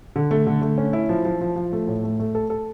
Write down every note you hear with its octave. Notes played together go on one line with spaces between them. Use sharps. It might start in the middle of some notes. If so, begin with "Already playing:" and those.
D3
A3
D3
A3
C#4
E4
F3
F3
F3
F3
A3
A2
A3
A3
A4
A4